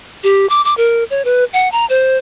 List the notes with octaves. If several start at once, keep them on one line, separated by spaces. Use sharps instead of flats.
G4
D6
D6
A#4
C#5
B4
F#5
A#5
C5